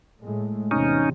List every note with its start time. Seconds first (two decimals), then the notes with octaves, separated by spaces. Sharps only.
0.22 A2 G#3 A3
0.71 E2 C3 C#4 D#4